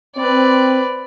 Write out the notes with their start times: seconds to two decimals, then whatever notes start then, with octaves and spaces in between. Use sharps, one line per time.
0.17 C4 B4 D5